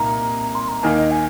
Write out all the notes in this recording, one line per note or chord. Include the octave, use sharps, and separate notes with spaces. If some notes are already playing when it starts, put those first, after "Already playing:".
Already playing: C2 A#2 A#3 D#4 A#5
A#5
C6
A#5
D#2 D#3 A#3 D#4 G#5
D#5
G#5